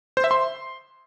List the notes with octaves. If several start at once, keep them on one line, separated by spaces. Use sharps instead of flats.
C5
E5
C6